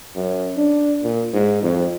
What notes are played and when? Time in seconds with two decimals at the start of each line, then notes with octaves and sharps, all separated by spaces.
0.16 F#2
0.57 D4
1.03 A#2
1.33 G#2
1.63 F2